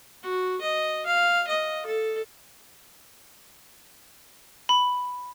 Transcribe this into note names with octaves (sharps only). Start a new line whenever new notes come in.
F#4
D#5
F5
D#5
A4
B5